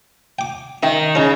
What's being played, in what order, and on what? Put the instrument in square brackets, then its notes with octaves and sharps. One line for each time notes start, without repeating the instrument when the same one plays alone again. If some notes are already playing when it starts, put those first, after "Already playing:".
[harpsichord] G5 D6
[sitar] D#3 [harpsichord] D#5 E5 G5
[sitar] C#3 [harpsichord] C#4 D#4